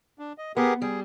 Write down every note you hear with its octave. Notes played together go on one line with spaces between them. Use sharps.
D4
D#5
B3 G4 G#4 A#4
G3 G#4